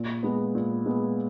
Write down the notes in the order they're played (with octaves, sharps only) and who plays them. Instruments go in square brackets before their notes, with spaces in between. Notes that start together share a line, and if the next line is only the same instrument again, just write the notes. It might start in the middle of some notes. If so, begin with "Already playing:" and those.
Already playing: [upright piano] A#2
G#3 B3
A#2
G#3 B3